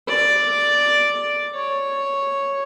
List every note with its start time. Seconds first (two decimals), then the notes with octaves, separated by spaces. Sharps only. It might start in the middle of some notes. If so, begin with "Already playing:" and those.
0.08 D5
1.55 C#5